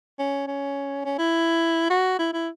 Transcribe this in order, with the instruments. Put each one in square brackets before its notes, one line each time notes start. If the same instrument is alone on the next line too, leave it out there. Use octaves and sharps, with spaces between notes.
[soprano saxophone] C#4
C#4
C#4
E4
F#4
E4
E4